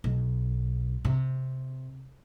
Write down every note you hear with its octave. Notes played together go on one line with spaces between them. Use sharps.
B1
C3